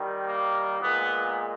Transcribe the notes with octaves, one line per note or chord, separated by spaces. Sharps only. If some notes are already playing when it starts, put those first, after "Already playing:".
Already playing: D#3 G3
A#3
A#2 G#3 B3